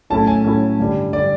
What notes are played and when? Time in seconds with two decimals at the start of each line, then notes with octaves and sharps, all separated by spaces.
0.10 A2 F#3 A3 C#4 E4 A5
0.27 G#5
0.44 A2 F#3 A3 C#4 E4
0.79 G2 D3 G3
1.13 D3 G3 D5